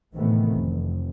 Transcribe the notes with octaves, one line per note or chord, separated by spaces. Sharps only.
A2 C3 D#3 E3 A3 B3
F1